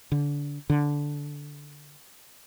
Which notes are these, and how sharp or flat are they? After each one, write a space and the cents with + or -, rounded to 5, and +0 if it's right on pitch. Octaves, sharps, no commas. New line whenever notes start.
D3 -25
D3 -10